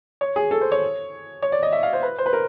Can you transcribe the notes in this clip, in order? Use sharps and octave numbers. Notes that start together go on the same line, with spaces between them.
C#5
G#4
A4
C5
C#5
C#5
D5
D#5
E5
F5
C5
B4
C5
B4
A#4